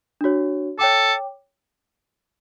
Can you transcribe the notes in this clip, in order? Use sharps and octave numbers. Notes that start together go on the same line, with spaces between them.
D4 F#4 C#5
A4 C#5 G5 D6